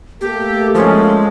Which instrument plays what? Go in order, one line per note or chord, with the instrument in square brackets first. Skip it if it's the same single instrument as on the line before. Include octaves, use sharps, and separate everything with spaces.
[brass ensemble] A3 A#3 A4 [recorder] G4
[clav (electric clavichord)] F3 C#4 [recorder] G#3